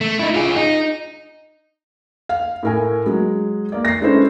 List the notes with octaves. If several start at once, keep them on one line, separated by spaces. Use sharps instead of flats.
A3
D#4 E4
F4 G#4
D#4
F5
A2 A#4 G#5
F#3 G#3
A#3 D5
A#6 C7
G#3 C#4 D4 E4 A4 C5